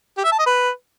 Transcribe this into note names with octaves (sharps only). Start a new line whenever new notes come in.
G4
E5
A5
D#5
B4